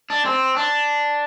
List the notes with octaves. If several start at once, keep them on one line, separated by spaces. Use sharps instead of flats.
D4
C4
D4